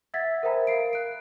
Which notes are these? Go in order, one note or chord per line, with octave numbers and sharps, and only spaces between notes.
E5 F#5 E6 G#6 A6 B6
A#4 C5 E5 G5 A#5 B5
A#4 F5 C7 D7
F#6 D7